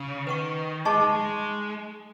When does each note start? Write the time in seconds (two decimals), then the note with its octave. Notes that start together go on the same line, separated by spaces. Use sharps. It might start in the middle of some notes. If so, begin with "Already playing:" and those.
Already playing: C#3
0.27 D#3 B4 F#5 C#6
0.85 G#3 D#4 G#4 D#5 A5 C#6
1.01 G#3
1.15 G#3